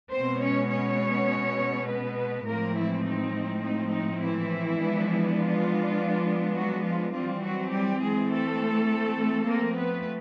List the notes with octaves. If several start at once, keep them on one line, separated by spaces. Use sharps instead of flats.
B2 G#3 B3 C4 C5
C#4 C#5
C#4 C#5
B3 B4
A2 F3 G#3 A#3 C4 A#4
E3 E4
D#4
D#4
D#4
E3 E4
F3 G#3 B3 D4
F3 F4
F#3 F#4
F3 F4
E3 F3 G3 C4 F4
F#3 F#4
G3 G4
G#3 G#4
A3 A4
F3 A3 A#3 C4 A#4
B3 B4